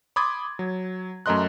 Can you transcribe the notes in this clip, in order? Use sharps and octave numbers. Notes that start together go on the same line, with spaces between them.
B5 C6 D6 D#6 G#6 A6
F#3
F#2 A3 A#4 D#5 C6 F#6